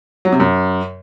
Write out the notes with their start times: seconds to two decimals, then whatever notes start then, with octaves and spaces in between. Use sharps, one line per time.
0.25 F#3
0.32 C3
0.40 F#2